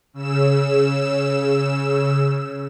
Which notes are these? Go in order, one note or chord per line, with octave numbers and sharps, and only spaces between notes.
C#3 E6 E7